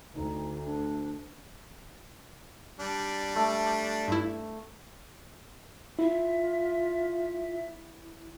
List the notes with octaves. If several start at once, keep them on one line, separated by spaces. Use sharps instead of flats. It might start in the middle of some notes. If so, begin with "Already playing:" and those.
D2 D#4
D4
G3 D4
A3
G2 E4
E4 F4 E5